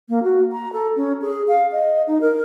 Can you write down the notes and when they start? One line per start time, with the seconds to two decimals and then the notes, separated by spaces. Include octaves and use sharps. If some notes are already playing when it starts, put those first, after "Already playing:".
0.09 A#3
0.23 F#4
0.52 A#5
0.73 A4
0.96 C#4
1.22 G#4
1.48 F5
1.72 D#5
2.07 D#4
2.21 A#4